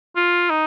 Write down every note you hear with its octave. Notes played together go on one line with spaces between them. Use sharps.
F4
D#4